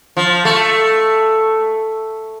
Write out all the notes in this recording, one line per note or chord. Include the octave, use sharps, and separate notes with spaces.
F3
A3